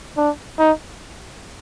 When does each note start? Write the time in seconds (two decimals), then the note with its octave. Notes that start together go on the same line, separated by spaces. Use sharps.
0.17 D4
0.59 D#4